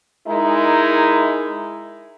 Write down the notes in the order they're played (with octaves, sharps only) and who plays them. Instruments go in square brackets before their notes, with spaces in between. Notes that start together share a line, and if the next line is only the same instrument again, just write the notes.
[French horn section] G#3 D#4 E4 A#4